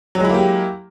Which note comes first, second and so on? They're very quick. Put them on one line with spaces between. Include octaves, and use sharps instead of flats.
F#3 G#3 E4 A#3 G4